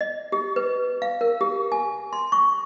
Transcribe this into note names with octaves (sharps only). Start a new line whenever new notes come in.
D#5
G4
B4
F5
A#4
G4
G#5
C6
C#6